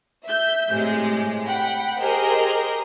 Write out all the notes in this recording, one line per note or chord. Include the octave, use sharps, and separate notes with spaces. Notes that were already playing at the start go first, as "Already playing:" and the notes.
E5 G6
A2 C3 G#3
F#5 G5 B5
G4 G#4 A#4 C5 D#5